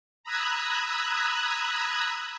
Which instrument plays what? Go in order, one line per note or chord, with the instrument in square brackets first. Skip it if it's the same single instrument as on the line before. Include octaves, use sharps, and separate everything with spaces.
[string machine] A#5 B5 D#6 E6 F#6 G#6